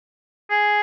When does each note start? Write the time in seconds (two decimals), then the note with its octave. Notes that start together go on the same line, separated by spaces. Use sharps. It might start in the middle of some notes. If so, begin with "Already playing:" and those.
0.50 G#4